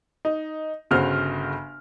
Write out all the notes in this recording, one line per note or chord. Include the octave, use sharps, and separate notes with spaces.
D#4
G1 C#3 F#4 C5 F6